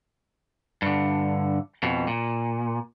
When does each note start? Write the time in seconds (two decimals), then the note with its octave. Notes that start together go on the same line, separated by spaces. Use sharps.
0.82 G2 D3
1.83 F2 B2
2.07 A#2